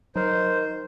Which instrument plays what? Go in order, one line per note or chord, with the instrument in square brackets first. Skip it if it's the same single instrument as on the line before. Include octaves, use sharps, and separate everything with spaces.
[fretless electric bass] F#3 [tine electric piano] D#4 A#4 D#5 [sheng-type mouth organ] C5